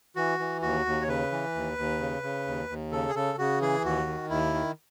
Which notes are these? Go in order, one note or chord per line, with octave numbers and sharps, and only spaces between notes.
E3 F#4
E3
D#2 F#4
D#2
C#5
C#3 B4
E3
D#2
D#2
C#3
C#3
D#2
D#2
C#3 A4
G#4
C#3 A4
C#3 F#4
E3 G#4
D#2 F#4
D#3
D#2 E4
D#3